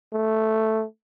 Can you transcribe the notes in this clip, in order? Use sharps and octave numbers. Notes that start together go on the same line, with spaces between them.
A3